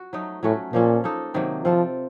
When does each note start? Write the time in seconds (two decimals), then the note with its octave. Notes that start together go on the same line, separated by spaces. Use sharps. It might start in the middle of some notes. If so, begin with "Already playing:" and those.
Already playing: F#4
0.13 F#3 A3 D#4
0.43 A2 F#3 A3 C#4 F#4
0.73 A#2 F3 A#3 C#4 A4
1.04 A#3 D#4 A4
1.34 C3 D#3 F#3 A#3
1.64 F3 C4 F4 A4